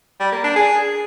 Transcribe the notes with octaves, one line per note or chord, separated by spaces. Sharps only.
G3
A#3
D4
G#4